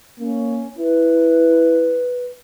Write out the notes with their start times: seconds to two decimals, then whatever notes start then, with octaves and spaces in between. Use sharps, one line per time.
0.19 A#3 C#4
0.78 E4 B4